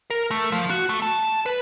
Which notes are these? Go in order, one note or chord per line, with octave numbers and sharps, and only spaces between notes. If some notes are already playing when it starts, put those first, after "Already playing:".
A#4
A3
F3
F#4
A3
A5
B4